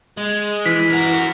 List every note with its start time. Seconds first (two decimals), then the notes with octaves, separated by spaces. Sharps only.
0.17 G#3
0.66 E3 B6
0.91 F#4 A#4